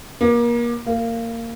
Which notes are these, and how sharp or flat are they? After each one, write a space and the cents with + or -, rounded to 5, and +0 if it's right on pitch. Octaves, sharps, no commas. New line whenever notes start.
A#3 +30
A#3 -20